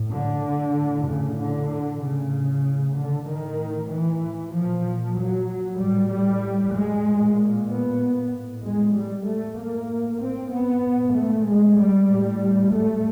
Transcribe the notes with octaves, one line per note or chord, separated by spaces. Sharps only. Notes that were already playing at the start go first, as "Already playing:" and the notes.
Already playing: A2
D3
A2
C#3
D3
A2 C#3
D3
A2 D#3
E3
A#2 F3
F#3
A2 G3
G3
G#3
A#2
B3
A2
G#3
G3
A3
A2 A#3
C4
B3
A#2
A3
G#3
G3
A2
A3